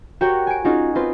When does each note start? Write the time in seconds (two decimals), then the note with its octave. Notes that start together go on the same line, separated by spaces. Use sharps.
0.21 F#4 G4 A#4 C#5 F#5 G5
0.47 G#5 D7
0.65 C#4 D#4 F4 F#4 G#4
0.95 C4 F4 B4